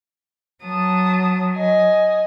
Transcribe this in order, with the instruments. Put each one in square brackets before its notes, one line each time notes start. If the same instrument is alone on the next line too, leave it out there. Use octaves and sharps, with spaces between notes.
[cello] F#3 [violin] A5 D#6
[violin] D#5 G#5